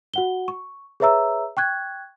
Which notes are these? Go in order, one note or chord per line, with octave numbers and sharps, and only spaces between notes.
F#4 F#5 G7
C#6
G#4 B4 C#5 E5 A#5 E6
G5 C#6 F#6 G#6